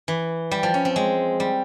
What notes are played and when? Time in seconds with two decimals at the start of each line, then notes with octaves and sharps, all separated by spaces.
0.08 E3
0.51 G3
0.63 F3
0.74 C#4
0.85 C4
0.96 G#3
1.40 G3